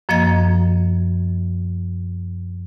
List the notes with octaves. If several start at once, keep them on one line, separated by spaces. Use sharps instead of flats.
F#2 F3 A#3 D#5 G#6